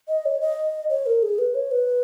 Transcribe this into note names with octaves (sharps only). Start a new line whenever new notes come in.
D#5
C#5
D#5
C#5
A#4
G#4
B4
C#5
B4